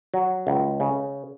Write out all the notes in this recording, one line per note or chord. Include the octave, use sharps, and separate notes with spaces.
F#3
C#2
C#3